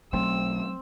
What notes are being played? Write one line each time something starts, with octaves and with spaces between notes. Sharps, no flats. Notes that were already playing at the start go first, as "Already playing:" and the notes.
B1 F#3 A3 C4 E6